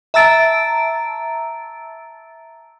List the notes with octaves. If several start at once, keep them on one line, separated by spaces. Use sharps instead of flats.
E5 A5 A#5 E6 A6 D7